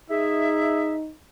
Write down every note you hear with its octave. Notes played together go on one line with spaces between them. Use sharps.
D#4 G#4 E5